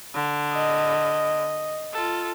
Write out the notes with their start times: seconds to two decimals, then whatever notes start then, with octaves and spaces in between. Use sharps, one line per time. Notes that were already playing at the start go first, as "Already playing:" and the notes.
0.14 D3
0.54 D#5
1.92 F4 A4